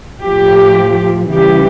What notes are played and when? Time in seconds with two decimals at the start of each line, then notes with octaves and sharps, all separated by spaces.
0.23 A2 F3 G4
1.30 C#3 E3 G3 G4